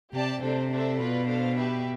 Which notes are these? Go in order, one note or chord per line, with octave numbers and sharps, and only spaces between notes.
C3 G4 D5 A5
C3 A3 D4 A4 C5
A3 D4 A4 C5 E5
B2 F4 B4 D5
D4 A4 C5 F5
G4 B4 E5